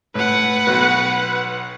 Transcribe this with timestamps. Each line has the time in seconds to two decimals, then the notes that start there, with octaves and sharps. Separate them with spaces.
0.15 A2 B4 F#5
0.67 B1 B3 F#4